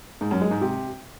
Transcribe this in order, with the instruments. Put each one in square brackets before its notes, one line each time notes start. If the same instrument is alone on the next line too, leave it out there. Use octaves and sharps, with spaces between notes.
[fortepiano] G#2
F#2
G#3
G#2
C3